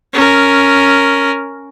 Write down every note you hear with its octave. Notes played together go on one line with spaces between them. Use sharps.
C#4 A#4